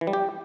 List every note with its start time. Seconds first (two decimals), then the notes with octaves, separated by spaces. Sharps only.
0.01 E3
0.07 G3
0.13 G4